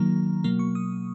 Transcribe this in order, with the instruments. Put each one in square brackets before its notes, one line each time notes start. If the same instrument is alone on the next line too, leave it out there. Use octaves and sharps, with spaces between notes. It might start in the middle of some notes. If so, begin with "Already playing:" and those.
Already playing: [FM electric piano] D#3 F#3 A#3 A#5
B2 F#3 A#3
C#6
D#6